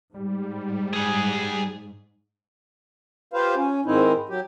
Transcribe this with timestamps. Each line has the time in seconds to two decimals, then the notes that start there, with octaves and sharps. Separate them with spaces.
0.14 G#2 G3
0.93 G#4 F#5
3.33 F4 G4 B4 C5 F5
3.55 C#4
3.86 G#2 D#3 C4 D#4 E4
4.29 F#3 G4